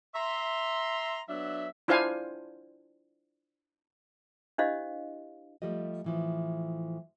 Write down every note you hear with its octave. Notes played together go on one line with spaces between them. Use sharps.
E5 A#5 C6
F#3 B3 D4 E5
D4 E4 F4 C5 F5 G#5
D4 E4 G4 C5 D#5 F5
F3 G3 A3 G4 D#5
A2 E3 F3